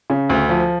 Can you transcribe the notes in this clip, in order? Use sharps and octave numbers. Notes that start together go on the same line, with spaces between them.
C#3
D2
F3